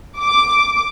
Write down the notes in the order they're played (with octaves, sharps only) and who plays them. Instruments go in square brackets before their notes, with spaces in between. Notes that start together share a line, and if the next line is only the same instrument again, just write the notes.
[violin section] D6